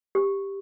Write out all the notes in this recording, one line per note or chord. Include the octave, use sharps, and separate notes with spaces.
G4